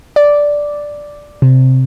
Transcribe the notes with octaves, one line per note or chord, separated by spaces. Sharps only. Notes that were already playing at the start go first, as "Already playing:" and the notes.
D5
C3